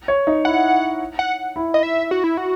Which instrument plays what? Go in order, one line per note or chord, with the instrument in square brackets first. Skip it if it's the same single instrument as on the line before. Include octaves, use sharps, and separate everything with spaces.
[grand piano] C#5
D#4
[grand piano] E4 [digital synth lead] F#5
[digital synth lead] F#5
[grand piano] E4
[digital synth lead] D#5
E5
F#4
E4
F#4